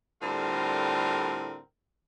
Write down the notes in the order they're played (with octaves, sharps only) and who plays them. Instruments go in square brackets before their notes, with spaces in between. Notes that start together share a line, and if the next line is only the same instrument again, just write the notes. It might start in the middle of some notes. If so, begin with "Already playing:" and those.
[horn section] A2 D3 G3 C4 F4 A#4